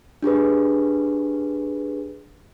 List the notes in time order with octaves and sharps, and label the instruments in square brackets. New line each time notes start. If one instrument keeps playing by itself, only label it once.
[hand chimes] D4 G4 G#4 B4